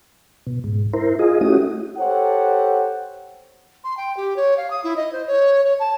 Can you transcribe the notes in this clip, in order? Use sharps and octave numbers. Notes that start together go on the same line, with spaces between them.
B2
G#2
E4 A#4 C5
F4 G#4 D#5
A3 C#4 E4 F#4 G4 D#6
G4 A4 C5 C#5 F#5
C6
G5
G4
C#5
F5
D#6
E4
D#5
C5
C#5
C#5
A5